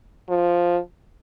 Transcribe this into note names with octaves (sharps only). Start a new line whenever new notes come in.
F3